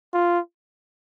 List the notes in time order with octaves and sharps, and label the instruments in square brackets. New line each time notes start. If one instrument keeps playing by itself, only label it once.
[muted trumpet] F4